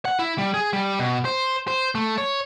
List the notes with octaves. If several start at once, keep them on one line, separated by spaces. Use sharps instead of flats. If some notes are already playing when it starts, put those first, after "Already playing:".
F#5
E4
G3
G#4
G3
B2
C5
C5
A3
C#5